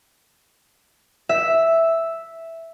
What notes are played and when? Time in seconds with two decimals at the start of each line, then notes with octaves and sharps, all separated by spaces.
1.29 E5